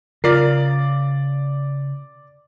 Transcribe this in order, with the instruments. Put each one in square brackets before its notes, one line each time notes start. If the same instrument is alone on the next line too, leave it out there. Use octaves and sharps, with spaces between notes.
[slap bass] C#3 [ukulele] F4 [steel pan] A#4 [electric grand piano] D5 C7